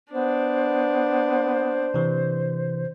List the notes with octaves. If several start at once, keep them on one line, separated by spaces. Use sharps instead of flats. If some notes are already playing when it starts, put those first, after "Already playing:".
B3 D4 C5
C3 E3